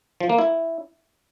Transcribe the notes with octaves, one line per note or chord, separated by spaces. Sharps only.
F3
A#3
E4